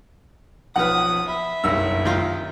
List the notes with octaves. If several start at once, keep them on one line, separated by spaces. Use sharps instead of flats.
B1 F3 B4 F#5 D#6 F6
E5 B5
F#1 B1 G2 E6
D#3 F4